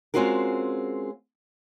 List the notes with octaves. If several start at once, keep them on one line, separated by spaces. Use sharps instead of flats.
G#3 C4 C#4 F4 F#4 A#4